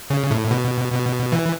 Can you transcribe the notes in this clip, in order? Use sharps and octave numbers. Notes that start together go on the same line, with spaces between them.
C#3
A2
B2
B2
E3